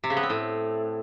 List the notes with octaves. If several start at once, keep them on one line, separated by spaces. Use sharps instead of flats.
C3
C#3
B3
C4
A2